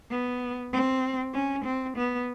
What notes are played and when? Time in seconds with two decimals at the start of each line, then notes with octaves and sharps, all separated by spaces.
0.11 B3
0.73 C4
1.34 C#4
1.65 C4
1.97 B3